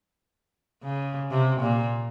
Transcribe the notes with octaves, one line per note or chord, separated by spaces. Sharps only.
C#3
C3
A#2